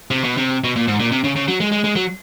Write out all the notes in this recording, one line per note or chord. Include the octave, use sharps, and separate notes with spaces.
C3
B2
C3
B2
A#2
G#2
A#2
C3
C#3
C#3
F#3
G#3
G#3
G#3
F#3